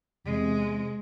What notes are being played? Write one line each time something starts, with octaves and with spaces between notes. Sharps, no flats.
E2 C3 G#3